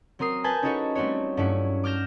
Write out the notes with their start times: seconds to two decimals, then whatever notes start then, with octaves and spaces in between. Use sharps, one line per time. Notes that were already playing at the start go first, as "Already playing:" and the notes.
0.19 F#3 C4 A#4 D#6 C7
0.44 B4 G#5 A5 G6
0.62 C#4 D#4 E4 F#4 A4 C#5
0.95 G3 A3 C4 F#4 C#5
1.37 G2 F#3 A3 C#4 E4 F#4
1.84 D6 F6 G6 A#6 E7